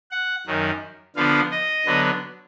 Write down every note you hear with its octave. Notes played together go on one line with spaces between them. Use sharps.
F#5
F#2 D#3 F#3
D3 F3 B3 F5
D#5
D3 F#3 B3